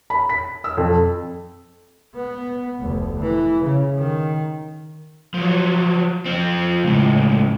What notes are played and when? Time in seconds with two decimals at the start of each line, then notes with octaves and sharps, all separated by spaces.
0.10 B5
0.29 B6
0.64 E6
0.77 F2
2.15 B3
2.79 F1 D2
3.20 E3
3.63 C#3
3.97 D#3
5.34 F3 F#3
6.26 F3 C4
6.84 C#2 A2